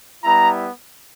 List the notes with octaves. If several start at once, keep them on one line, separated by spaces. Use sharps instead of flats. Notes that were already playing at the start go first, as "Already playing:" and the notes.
G3 B3 E4 A#5